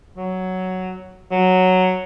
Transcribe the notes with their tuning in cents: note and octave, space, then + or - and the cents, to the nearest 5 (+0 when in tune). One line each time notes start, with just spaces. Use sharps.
F#3 +5
F#3 +0